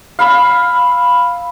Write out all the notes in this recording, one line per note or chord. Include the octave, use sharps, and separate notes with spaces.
F5 B5 E6